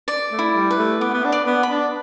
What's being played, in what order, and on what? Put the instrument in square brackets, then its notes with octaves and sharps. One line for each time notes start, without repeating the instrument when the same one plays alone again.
[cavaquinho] D5
[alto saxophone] A3
[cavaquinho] E4
[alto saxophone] G3
[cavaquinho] B4
[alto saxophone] A3
[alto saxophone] B3 [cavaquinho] D6
[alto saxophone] B3
D4
[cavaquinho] D5
[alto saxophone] B3
[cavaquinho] B5
[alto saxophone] D4